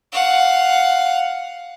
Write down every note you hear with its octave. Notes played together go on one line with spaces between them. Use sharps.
F5 F#5